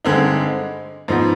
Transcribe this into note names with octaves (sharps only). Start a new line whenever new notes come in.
G2 D3 G#3 C4 D#4
G#2 F3 B3 D#4